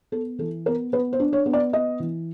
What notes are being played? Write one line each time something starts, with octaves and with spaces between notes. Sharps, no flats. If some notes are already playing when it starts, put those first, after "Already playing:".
B3 A4
E3 A4
B3 A#4
B3 B4
C5
D4
C#5
B3
D5
B3 D#5
E3